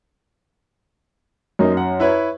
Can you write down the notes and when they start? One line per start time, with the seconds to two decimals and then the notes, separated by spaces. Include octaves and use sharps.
1.59 F#2 A#3 D#4
1.77 F#5
2.00 E4 B4 C#5